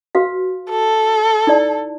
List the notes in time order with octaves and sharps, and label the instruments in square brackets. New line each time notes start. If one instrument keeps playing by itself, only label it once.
[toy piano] F#4 B4 F5
[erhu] A4
[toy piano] D#4 E4 D5